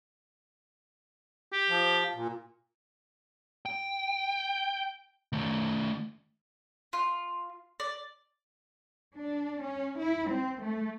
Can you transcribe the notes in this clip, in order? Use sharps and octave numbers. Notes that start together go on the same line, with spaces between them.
G4
F3
A#2
G5
D#3 A3
F4
D5
D4
C#4
E4
C4
A3